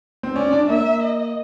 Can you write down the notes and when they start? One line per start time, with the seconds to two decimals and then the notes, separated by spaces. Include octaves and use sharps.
0.23 C4
0.35 C#4 D5
0.52 D4
0.69 A#3 E5
1.03 D#5